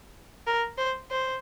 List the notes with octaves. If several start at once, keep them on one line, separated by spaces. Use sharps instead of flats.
A#4
C5
C5